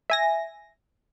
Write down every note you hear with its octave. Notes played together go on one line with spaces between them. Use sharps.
E5 G#5 A#6